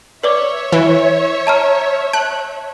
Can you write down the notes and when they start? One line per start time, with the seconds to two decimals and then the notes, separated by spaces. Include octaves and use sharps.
0.23 B4 C#5 D5 E5 D6
0.72 E3
1.47 A5 A#5 F6
2.13 A5 F#6